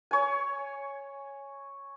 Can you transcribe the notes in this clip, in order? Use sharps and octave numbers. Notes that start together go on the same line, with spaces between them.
C#5 G#5